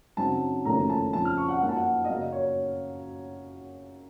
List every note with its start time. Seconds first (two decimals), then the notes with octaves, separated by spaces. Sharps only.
0.17 F#2 C#3 F#3 C4 D#4 A5
0.65 F#1 F2 D#3 A3 C#4 A#5
0.90 A5
1.13 F2 C#3 F3 A5
1.25 F6
1.37 C#6
1.48 F#5
1.61 F#2 F3 A#3 D#4 F#5
1.69 A5
1.76 F#5
2.04 D#5
2.08 F#2 C#3 F#3 A#3 F5
2.21 D#5
2.32 C#5